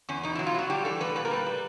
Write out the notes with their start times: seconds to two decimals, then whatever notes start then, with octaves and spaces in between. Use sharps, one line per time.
0.09 E2 C#4
0.23 B2 D#4
0.35 F#3 E4
0.46 F4
0.54 F#3 F#4
0.70 G3 G4
0.85 E3 A4
1.01 A2 B4
1.15 A#2 B4
1.25 A#4
1.31 G3 B4
1.46 G3